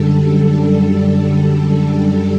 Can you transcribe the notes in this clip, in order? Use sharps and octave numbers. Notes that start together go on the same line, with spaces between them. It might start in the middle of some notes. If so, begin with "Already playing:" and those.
Already playing: F#2 D3 G3 A4
A4
A4